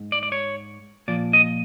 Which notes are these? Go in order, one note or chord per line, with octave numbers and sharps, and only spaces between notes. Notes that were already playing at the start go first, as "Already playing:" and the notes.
Already playing: G#2
D5
D5
C#5
A#2 F3 D5
D#5